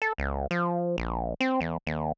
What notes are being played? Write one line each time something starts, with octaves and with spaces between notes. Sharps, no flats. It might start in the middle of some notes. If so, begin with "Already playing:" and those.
A4
C#2
F3
A#1
C4
E2
D#2